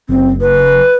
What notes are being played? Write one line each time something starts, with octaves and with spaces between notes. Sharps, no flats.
F#1 C4
B4